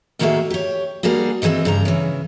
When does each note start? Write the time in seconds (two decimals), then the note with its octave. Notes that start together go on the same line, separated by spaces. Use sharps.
0.19 A2 D#3 A#3 F#4 G#4 E5
0.50 G4 C#5
1.03 G3 A#3 D4 F#4 G#4
1.42 D#3 E3 G#3 A3 C4
1.65 G2 C#3 A#5
1.85 C#3 E3